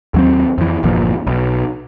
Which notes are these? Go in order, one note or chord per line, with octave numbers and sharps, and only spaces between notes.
D#2 F#3 C4
F2 E3
G1 E2 A#2 F3
B1